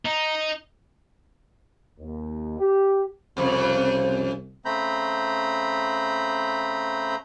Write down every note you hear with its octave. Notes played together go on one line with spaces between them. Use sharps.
D#4
D#2
G4
C2 F2 C#3 C5
C#3 A3 C4 A#5 B5 G6